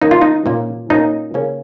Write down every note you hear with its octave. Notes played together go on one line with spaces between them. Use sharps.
D#3 A#3 C#4 D#4
F4
D#4
A#2 A#3 C#4
A#2 A#3 C#4 D#4
C#3 A#3 C#4